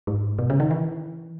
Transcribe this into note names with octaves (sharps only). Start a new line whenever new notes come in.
G#2
B2
C#3
D#3
E3